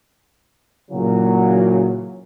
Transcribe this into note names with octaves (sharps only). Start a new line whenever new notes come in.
A#2 C#3 E3 F#3